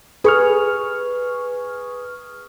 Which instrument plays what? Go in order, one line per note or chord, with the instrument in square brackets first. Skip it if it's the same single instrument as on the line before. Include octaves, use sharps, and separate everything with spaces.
[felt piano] G#4 [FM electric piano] B4 C#6 F6